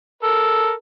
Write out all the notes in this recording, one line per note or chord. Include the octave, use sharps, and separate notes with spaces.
A4 A#4